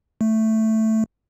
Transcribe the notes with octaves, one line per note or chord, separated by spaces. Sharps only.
A3